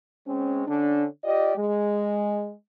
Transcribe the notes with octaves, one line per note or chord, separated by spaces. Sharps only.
G#3 C4 C#4
D3 C#4 D4
F4 G4 D5 D#5
G#3